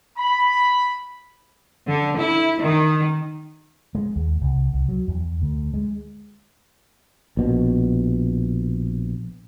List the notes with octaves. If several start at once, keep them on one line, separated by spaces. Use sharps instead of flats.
B5
D3
E4
D#3
G#3
D#2
C2
C2
F#3
E2
D2
G#3
A#1 B2